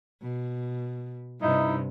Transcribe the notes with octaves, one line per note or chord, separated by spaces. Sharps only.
B2
G2 C3 D#4 E4